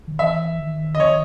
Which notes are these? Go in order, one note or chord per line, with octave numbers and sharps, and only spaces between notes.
D#3
E3 E5
D#3
D#5
D#3 C#5